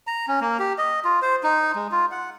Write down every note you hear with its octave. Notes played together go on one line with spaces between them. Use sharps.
A#5
C#4
A#3
G4
D#5
F4
C5
D#4
G#3
F4
F#5